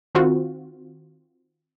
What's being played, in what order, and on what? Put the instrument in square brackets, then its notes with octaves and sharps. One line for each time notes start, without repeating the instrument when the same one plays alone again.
[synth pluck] D#3 C4 F4 F#4